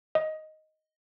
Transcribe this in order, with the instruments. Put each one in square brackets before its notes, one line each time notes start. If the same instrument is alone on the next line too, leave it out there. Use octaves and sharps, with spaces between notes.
[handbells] D#5